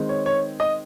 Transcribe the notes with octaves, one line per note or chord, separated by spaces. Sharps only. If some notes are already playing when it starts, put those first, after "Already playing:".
Already playing: D#3 G#3 C4
C#5
C#5
D#5